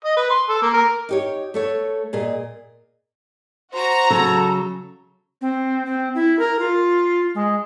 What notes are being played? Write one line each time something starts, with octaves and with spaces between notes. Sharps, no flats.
D#5
B4
C6
A4
A#3
A#4
D#4 G4 C#5
A3 A4 C#5
A#2 G#4 D#5
F#4 C5 A#5
C#3 F#3 A4
C4
C4
E4
A#4
F4
G#3